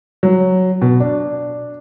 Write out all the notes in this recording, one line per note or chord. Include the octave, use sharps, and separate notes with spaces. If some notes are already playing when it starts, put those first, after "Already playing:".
F#3
B2
D4